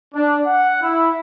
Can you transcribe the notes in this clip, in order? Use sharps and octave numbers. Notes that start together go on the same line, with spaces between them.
D4
F#5
E4